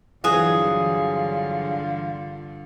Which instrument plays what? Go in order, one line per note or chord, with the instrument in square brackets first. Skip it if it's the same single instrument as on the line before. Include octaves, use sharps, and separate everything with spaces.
[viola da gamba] G2 D3 [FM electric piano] E3 [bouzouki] F#3 G#4 [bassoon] F4